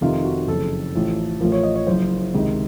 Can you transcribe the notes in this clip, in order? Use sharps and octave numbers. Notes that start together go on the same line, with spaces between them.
F1 F2 C3 D#3 F4
F#4
F#1 F2 C#3 A4
A1 A2 F3
A1 A2 F3 A#4
C#5
D#5
C#5
F#1 F#2 F3 C5
C#2 C3 D#3